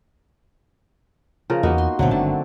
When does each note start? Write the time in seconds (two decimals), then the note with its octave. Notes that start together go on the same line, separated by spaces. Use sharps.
1.50 C#3 F3 A#4
1.63 E2 A#3 B3 D#4 F#4
1.78 C6
1.99 C#2 A#2 D3 F#3 A3 C4
2.11 G1 D#3 D4 A5